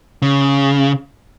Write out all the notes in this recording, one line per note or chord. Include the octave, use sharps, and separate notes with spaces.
C#3